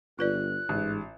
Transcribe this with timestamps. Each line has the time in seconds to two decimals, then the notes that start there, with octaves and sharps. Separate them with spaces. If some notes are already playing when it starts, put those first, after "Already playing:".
0.19 G1 F4 B4 D5 F#6
0.69 A1 G#2